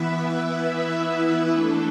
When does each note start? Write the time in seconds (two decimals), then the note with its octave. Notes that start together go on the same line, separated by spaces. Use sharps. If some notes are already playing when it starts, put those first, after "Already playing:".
Already playing: E3 B3 E4 B4 E5
1.53 E3 A3 D4 A4